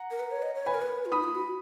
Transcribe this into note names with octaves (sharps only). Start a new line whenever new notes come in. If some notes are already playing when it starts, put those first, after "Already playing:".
Already playing: F#5 A#5
A#4
B4
C#5
D#5
C#5
B4 G#5 B5
A#4
B4
F4
D#4 B5 D#6
F4
F#4